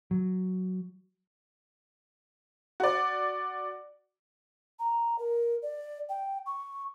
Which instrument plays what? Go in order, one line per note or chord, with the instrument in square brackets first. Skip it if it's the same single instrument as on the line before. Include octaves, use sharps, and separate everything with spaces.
[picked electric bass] F#3
[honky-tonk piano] F#4 D5
[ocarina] A#5
A#4
D5
G5
C#6